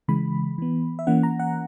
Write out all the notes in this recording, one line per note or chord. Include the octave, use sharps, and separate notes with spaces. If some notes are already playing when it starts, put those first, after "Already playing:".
C#3 E3 G#3 B5
E3 B3
E5
E3 A#3 C#4 F#5
A#5
F#5